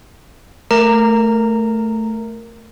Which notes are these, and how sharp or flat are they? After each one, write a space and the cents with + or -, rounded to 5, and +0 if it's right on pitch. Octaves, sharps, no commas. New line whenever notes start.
A3 +0 A#4 +0 A#5 -15